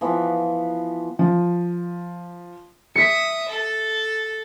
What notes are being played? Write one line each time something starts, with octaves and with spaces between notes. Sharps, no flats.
E3 F3 B3
F3
E5 D#6 B6 C#7
A4